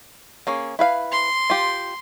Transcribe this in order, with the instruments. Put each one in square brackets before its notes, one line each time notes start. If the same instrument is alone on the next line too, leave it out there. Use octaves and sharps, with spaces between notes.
[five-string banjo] A#3 C#4 G#4
E4 B4 F5
[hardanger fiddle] C6
[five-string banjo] F4 G4